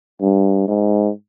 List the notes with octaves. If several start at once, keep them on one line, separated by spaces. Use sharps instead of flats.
G2
G#2